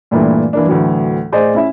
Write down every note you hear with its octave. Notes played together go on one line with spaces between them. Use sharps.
G2 A#2 E3 A3
E3 A#3 D4
D2 A2 E3 F#3
A2 G#4 C5 D5 D#5
C#4 E4 E5